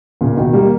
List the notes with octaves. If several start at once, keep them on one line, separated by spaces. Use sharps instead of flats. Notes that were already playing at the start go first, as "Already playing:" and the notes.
A#2 C#3
B2 D#3
G3 A#3